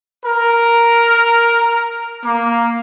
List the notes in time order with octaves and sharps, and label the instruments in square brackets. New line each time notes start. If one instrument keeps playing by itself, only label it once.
[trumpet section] A#4
A#3